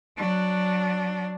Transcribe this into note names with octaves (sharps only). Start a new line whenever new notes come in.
F#3 D4